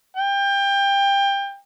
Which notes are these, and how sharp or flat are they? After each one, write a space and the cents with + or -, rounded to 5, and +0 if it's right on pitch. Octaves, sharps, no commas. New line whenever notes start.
G5 +25